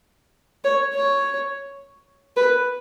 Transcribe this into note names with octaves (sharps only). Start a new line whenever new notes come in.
C#5
C#5
B4